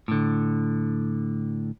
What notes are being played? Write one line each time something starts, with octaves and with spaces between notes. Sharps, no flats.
A2 D3